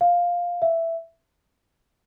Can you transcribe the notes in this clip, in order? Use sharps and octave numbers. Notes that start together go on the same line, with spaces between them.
F5
E5